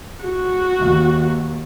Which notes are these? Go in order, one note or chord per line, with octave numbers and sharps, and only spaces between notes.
F#4
D#2